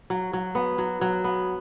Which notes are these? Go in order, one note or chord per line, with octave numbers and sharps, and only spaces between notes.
F#3
F#3
B3
F#3
F#3
B3